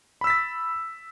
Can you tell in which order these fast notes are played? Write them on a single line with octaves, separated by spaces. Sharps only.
B5 E6 B6 A6